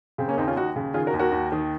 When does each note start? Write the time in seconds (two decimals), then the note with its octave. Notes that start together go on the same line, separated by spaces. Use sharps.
0.18 C#3 C4
0.28 A#3 C#4
0.37 D#2 C4 D#4
0.47 C#4 F4
0.56 D#2 D#4 F#4
0.76 C#3
0.94 D#3 F4 G#4
1.07 F#4 A#4
1.14 D#2
1.19 F#4 A#4
1.32 D#2
1.52 D#3